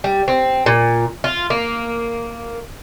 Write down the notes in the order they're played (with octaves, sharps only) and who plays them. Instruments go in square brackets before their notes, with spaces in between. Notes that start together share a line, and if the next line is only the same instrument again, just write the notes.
[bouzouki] G3
C4
A#2
F4
A#3